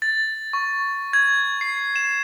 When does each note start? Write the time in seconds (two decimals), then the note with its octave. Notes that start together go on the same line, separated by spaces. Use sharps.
0.02 A6
0.53 C#6
1.13 G#6
1.61 C7
1.96 E7